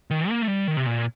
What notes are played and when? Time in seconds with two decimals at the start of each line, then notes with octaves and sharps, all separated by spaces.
0.11 D#3
0.29 A#3
0.42 A3
0.47 G3
0.68 D#3
0.77 C3
0.86 A#2